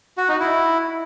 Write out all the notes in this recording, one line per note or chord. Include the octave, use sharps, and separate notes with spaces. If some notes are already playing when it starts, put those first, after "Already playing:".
F#4
D#4
E4